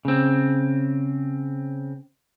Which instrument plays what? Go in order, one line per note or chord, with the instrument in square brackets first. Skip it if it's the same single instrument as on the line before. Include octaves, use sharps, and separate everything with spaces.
[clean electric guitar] C#3 C4